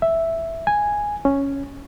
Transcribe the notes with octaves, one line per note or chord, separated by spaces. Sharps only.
E5
G#5
C#4